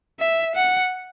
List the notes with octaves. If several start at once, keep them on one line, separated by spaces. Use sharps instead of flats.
E5
F#5